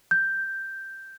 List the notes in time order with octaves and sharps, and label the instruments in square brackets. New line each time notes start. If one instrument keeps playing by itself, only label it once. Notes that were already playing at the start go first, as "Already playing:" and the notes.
[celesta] G6